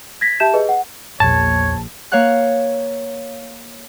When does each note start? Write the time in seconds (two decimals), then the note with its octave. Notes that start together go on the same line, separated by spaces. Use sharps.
0.21 G#6 A#6 B6
0.40 G4 E5 A5 G6 E7
0.54 G#4 B4 D#5
0.69 F#5
1.20 A#1 E2 C#5 A5
2.12 A#3 C#5 F5 F#5 F#6